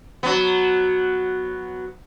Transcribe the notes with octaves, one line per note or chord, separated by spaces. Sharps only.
F#3 B3